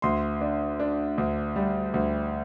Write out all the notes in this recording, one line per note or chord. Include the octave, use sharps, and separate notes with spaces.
D2 C6
D4
D4
D2
G3
D2